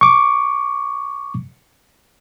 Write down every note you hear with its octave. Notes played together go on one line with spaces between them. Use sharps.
C#6 D6